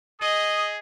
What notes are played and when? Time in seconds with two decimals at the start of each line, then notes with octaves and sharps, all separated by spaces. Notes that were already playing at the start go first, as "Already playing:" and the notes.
0.21 G#4 D#5 D#6